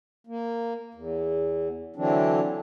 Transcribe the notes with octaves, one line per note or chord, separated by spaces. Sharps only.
A#3
E2
D3 E3 F#3 C4 D4